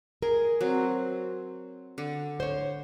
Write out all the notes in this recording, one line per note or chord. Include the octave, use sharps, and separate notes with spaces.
G#4 A#4
F#3 C4
D3
C5 C#5